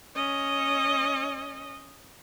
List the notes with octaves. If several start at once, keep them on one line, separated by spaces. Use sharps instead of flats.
C#4 D#5